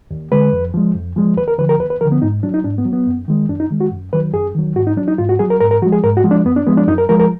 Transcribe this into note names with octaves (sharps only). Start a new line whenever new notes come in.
D#2
D3 G#3 B4
F2
F3 G#3
F2
F3 G#3
D#2 B4
A#4
D3 F3 B4
A#4
D#2 B4
B4
D3 F3 A#4
B3
G#2 D#4
F#3 D4
D#4
G#2 D4
B3
F#3
B3
F#2
D#3 G#3
F#2 D4
D#4
D#3 G#3
F#4
F#2
D#3 F#3 B4
F#2 G#4
D#3 F#3
G#2 F#4
D#4
F#3 D4
D#4
G#2 F4
F#4
F#3 G#4
A#4
G#2 A#4
A#4
F3 G#3 F#4
G#4
G#2 A#4
F#4
F3 G#3
D4
F#2 B3
D4
F3 G#3 B3
D4
F#2 D#4
A#4
F3 G#3 A#4
A#4